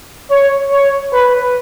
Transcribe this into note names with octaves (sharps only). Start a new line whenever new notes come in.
C#5
C#5
B4